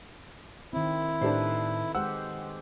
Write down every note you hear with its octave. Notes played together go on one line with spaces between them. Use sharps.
D#3 C4 E4
A2 D4 D#4 G4 A4 B4 C5
G#3 G4 C5 F#5 E6